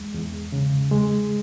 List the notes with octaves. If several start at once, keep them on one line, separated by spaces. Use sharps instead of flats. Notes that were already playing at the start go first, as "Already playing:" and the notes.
Already playing: E2 G#3
E2
C#3
G#3